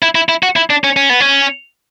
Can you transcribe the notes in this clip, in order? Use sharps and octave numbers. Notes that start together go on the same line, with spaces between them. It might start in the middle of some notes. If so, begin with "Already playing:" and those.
E4
E4
E4
F#4
E4
D4
C#4
C#4
B3
C#4